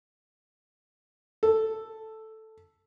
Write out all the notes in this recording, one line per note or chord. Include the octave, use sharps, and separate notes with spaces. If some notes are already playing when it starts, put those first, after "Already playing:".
A4